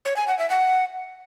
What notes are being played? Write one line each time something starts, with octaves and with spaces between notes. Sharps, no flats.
C#5
G#5
F#5
E5
F#5